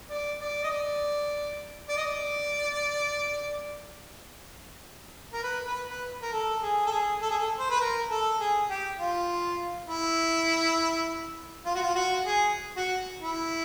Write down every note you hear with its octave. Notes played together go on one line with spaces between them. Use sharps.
D5
D5
D#5
D5
D5
D#5
D5
A#4
B4
B4
B4
A#4
A4
G#4
A4
G#4
A4
G#4
A4
C5
B4
A#4
A4
G#4
G4
F4
E4
F4
F#4
F4
F#4
G#4
F#4
E4